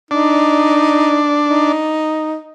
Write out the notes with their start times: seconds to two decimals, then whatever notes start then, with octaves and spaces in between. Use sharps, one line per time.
0.11 D4 D#4
1.47 D#4